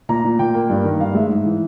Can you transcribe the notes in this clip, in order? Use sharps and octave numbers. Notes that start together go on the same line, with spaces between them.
A#2 A#5
A#2
A#2 G5
A#3
G2
D#3
G2 F5
G#3 E5
G#2
E3